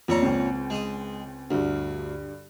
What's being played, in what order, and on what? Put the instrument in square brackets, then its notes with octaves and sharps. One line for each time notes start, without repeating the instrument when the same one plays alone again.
[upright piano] F2 [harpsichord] A#2 C#5 A#5
[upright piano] C#2 C4
[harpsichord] G#3 D#6
[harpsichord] D2 [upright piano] G2 D3